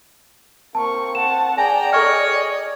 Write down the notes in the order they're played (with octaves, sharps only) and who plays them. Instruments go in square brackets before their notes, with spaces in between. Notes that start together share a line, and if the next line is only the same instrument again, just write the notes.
[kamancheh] A#3 C#6 [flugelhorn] C4 [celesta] A5
[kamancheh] F#5 A5 [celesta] E7
[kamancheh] G#4 D5 [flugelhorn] G5 [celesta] G#5 [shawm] A#5
[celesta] A4 C#6 F6 [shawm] C#5 [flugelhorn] D#5